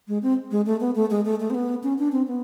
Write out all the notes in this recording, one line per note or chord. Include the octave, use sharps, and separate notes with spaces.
G#3
C4
G#3
A3
B3
A3
G#3
A3
A3
C4
B3
C#4
D4
C4
B3